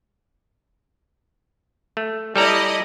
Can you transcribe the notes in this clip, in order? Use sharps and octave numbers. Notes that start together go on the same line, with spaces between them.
A3
G3 E4 A4 D5 D#5 A#5